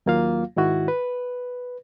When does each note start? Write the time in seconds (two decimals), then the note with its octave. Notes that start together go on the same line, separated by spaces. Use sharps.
0.06 D#2 F#3 A#3 F4 F5
0.56 G#2 D#3 E4 F#4
0.88 B4